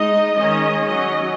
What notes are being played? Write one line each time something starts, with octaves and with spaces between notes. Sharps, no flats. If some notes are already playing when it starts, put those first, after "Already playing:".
Already playing: G#3 D#4 D#5
D#3 G#3 C#4 D#5
F#3 C#4 D#5